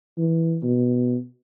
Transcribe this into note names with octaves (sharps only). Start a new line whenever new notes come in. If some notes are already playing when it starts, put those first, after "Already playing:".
E3
B2